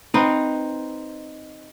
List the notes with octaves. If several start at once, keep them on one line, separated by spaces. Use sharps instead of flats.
C4 D#4 B4